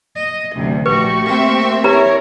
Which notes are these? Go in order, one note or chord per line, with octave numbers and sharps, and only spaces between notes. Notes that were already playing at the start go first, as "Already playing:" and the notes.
D#5
A1 D2 C3 F#3
A#1 A3 F#4 G4 B4 C#6
A#3 C4 E5
E4 G4 A#4 B4 C#5 A#5